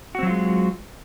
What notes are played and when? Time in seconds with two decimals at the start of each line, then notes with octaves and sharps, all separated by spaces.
0.15 F#4
0.19 C4
0.23 F#3
0.27 F4
0.31 G#3